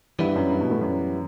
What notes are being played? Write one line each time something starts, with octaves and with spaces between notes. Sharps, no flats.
G2 E3 G3 B3 E4
F#2
G2
B2
A2
F#2